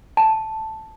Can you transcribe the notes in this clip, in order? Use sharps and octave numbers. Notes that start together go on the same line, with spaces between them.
A5